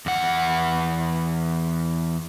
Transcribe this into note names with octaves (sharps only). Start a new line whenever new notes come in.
E2 F#5